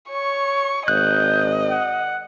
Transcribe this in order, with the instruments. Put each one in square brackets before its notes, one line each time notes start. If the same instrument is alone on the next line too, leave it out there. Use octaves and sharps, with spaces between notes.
[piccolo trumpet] C#5 [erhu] C#6
[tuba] G#1 [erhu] D#5 [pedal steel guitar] F#6 [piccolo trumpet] G6
[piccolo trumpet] F#5